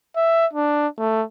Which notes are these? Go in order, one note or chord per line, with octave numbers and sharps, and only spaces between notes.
E5
D4
A3